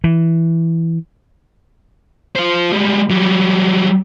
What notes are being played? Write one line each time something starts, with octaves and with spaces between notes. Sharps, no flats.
E3
F4 C5
G3 G#3
F#3 G3